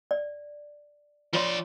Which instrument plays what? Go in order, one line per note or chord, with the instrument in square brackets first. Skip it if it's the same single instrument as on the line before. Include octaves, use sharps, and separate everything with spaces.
[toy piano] D5
[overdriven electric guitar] F3 D5 [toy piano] F4 C#5 C6